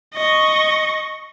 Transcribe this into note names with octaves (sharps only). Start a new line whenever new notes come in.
D#5 C#6